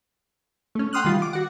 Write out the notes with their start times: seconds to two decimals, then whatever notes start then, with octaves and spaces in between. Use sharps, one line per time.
0.75 A3 C#4
0.93 F#5 G5 C6 D#6 F6 F#6
1.04 D#3 E3 G3 F4
1.22 D6
1.33 F#4 F#5